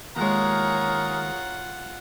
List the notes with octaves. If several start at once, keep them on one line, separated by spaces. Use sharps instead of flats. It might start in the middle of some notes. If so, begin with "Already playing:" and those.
D#2 G#3 F4 G#4 A#4 C#5 F#5 A#5